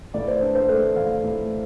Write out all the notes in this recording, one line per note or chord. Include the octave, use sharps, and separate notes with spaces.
A2 D5
C5
D4
C5
A3
A2 F5
A2